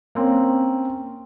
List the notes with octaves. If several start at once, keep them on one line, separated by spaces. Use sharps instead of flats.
A#3 C4 C#4